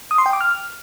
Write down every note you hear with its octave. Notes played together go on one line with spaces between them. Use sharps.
D#6
C6
G5
D6
F6